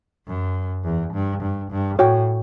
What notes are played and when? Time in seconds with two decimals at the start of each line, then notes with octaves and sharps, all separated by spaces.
0.27 F#2
0.84 E2
1.13 G2
1.41 G2
1.71 G2
1.99 A2 F#4 C#5 G5